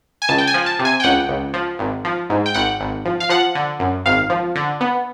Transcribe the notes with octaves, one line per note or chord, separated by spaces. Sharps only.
G#5
C#2 A5
G5
G#5
F3
A5
C3
G#5
G5
C#2 F#5
C#2
F3
G#1
F3
G#2
G5
G#1 F#5
G#1
F3
F5
F3 F#5
D3
F#2
G#1 F5
F3
D3
B3